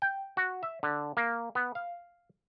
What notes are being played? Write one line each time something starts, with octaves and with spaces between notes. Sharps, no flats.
G5
F#4
E5
D3
A#3
B3
F5